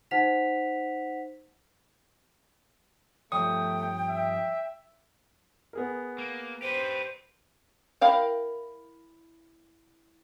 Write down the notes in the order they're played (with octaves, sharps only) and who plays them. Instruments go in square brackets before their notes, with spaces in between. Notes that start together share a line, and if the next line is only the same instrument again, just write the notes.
[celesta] D#4 C5 F#5 B6 F7
[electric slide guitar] G2 F3 C#5 [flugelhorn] A3 [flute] G5 [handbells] D#6
[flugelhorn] E5
[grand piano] B3 G#4 A#4
[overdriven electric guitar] A#3
[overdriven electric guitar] G4 B4 [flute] C5
[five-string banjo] E4 A#4 F5 G5